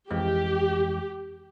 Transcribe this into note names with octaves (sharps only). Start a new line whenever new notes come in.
F2 E3 G#3 G4